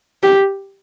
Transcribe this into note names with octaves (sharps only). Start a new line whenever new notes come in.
G4